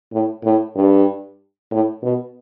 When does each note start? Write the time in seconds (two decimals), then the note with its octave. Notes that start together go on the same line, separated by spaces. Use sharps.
0.13 A2
0.44 A2
0.76 G2
1.71 A2
2.03 B2